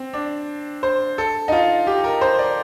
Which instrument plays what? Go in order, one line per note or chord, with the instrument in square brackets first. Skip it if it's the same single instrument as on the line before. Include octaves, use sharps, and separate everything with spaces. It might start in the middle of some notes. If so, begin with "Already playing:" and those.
Already playing: [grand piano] C4
D4
C5
A4
D#4
F4
G4
A#4
C5
D5